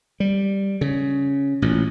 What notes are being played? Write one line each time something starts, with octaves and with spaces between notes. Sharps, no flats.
G3
C#3
A1 A#2